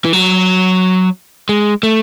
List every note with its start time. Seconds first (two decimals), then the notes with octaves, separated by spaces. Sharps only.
0.05 E3
0.13 F#3
1.49 G#3
1.83 A3